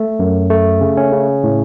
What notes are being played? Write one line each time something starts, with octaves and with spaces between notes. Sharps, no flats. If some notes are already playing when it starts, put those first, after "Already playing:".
Already playing: A3
F#2
A3
C#3
C#4
C#3
A2